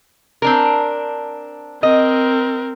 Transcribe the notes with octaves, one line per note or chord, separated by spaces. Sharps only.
C4 D4 A#4
C4 A#4 D#5